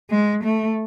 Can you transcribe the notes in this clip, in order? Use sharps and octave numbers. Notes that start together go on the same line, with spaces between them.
G#3
A3